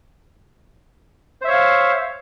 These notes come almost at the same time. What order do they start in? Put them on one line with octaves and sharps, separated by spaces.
C5 E5 C#5 F5